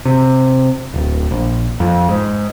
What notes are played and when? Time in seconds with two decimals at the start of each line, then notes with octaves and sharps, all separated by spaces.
0.05 C3
0.94 D1
1.31 A#1
1.80 F2
2.09 G#2